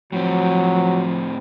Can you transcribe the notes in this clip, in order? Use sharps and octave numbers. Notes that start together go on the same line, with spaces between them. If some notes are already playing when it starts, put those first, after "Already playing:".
A2 F3 F#3 C4